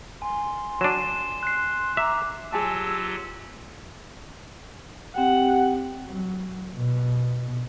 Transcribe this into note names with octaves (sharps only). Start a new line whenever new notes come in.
G#5 C6
F#3 D4 C7 D#7 E7
F#6 C7
E5 A#5 D6
F#3 F4 G4 G#4 G#5 A5 E6
C4 G4 F#5 G5
F#3
B2